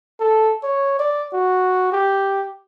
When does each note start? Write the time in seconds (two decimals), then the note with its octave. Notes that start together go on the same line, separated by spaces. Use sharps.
0.20 A4
0.63 C#5
0.99 D5
1.33 F#4
1.92 G4